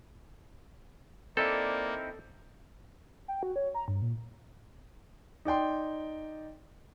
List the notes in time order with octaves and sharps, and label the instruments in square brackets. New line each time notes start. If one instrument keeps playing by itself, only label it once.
[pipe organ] A#3 [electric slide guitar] C4 D#4 E4 [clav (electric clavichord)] A4 [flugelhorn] D5
[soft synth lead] G5
F#4
C#5
A#5
G2
A#2
[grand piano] D#4 D5 G5 C6